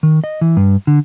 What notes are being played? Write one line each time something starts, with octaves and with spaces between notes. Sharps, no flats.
D#3
D#5
E3
G2
D3